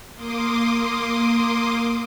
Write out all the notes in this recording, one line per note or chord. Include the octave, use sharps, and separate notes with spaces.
A#3 C6 D6 D#6